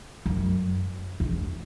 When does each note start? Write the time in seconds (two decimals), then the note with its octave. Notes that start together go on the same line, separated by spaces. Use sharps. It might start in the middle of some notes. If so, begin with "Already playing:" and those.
0.26 F#2
1.20 E2